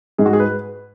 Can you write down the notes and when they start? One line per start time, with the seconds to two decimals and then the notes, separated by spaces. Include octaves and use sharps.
0.18 G#2 G#4
0.26 F#4
0.33 G#4
0.40 B4